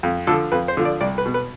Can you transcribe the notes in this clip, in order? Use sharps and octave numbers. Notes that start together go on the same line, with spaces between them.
F2
D3 F3 A4
F2 B4
C5
D3 F3
D5
C2 D5
B4
B2
B4